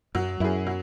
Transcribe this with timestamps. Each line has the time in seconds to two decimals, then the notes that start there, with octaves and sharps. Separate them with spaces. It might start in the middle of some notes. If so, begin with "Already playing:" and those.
0.15 F#2 F#3
0.40 F#2 E4 G#4
0.67 F#3